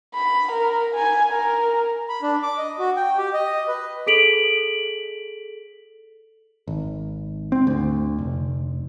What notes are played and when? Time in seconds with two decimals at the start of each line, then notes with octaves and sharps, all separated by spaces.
0.15 B5
0.52 A#4
0.95 G#5
1.32 A#4
2.09 B5
2.22 D4
2.43 D6
2.58 D#5
2.79 F#4
2.97 G5
3.18 G4
3.33 D#5
3.68 B4
4.06 G#4 A4 B6 D7 F7 F#7
6.67 G#1
7.52 C4
7.67 D2
8.19 F1